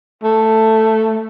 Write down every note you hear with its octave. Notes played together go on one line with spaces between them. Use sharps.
A3